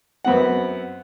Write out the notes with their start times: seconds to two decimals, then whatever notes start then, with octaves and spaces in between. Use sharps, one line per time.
0.25 F#2 B3 C4 F#5